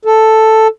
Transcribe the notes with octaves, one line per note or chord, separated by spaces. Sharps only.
A4